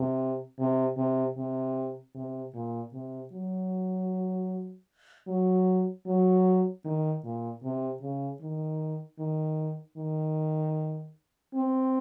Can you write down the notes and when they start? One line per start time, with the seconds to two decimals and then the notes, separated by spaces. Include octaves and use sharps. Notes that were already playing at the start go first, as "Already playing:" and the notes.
Already playing: C3
0.59 C3
0.97 C3
1.37 C3
2.15 C3
2.54 A#2
2.93 C3
3.32 F#3
5.28 F#3
6.07 F#3
6.85 D#3
7.24 A#2
7.63 C3
8.01 C#3
8.41 D#3
9.19 D#3
9.97 D#3
11.54 C4